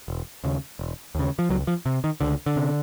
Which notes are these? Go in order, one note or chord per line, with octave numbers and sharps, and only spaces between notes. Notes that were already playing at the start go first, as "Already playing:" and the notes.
E1
D#2 C#3
E1
D#2 C#3
F3
C#2 F#3
F3
C3
D#3
C#2 D3
D3
C3